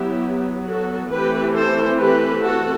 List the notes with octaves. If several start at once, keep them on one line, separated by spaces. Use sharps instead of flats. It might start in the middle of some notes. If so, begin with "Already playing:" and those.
Already playing: F#3 B3 E4 G4
F#4 A4
E3 A3 C4 G4 B4
A4 C5
G4 B4
F#4 A4